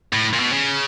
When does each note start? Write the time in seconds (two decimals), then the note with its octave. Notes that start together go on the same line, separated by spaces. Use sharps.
0.13 A2
0.33 A#2
0.39 B2
0.52 C#3